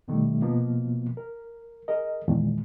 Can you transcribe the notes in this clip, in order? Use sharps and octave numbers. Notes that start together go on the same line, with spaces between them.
D2 B2 D#3 G3 A3
B2 F3 A#3 B3
A#4
G#4 A#4 D#5
E2 A#2 D#3 G#3